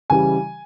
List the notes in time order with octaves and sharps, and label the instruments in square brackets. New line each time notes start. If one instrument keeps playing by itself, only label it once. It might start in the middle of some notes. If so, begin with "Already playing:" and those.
[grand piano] C#3 E3 G3 G#5